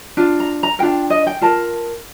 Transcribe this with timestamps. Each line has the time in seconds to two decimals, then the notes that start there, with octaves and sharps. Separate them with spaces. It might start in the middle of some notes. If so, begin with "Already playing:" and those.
0.17 D4 F4
0.40 A#5
0.63 A#5
0.79 D4 F4 A#4 G5
1.10 D#5
1.27 G5
1.41 F4 A#4 A5